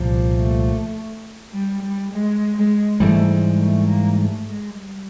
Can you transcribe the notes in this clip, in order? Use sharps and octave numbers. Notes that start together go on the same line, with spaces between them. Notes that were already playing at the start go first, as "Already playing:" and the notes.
Already playing: C2 A#2 F3
A3
G3
G3
G#3
G#3
G#2 E3 G3 A3
G#3
A3
A#3
A3
G#3
G3